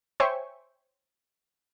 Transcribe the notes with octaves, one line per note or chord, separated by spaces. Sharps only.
C5 C#5 E5 G5 G#5 C#6